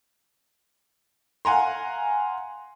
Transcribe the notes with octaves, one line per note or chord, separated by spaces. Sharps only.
F5 F#5 G#5 A#5 C6